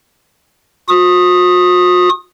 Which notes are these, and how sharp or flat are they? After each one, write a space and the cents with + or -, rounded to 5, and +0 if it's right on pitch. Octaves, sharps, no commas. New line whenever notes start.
F#4 -45 D#6 +0